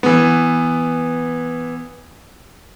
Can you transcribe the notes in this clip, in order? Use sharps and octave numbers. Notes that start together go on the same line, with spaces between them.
E3 B3